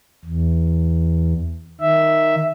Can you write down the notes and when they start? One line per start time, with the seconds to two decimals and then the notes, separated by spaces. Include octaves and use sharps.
0.25 E2
1.80 D#3 E5